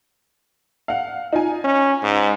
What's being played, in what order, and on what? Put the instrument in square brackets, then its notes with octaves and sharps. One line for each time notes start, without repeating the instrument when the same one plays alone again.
[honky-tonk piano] F5 F#5
D#4 F4 G#5
[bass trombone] C#4
G#2